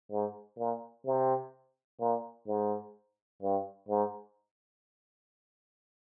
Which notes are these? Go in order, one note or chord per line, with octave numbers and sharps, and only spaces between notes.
G#2
A#2
C3
A#2
G#2
G2
G#2